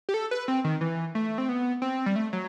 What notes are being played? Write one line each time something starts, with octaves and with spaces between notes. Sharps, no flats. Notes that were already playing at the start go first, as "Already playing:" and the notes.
G4
A4
B4
C4
D#3
E3
A3
C4
B3
C4
G3
A3
F#3